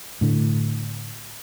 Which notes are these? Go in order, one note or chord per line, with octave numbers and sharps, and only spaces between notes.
A2 D3